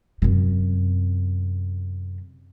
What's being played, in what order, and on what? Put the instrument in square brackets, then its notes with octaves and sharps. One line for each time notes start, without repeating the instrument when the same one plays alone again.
[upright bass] F#2 C3